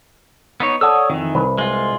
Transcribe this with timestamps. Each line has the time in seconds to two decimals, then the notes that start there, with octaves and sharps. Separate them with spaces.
0.60 B3 D#4 C#5
0.81 A4 C#5 D5 F#5 D#6 E6
1.10 F2 D#3 E3
1.35 C2 B4
1.58 G#3 F4